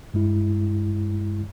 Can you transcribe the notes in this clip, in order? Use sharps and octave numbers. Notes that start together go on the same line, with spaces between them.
G2 G#3 E4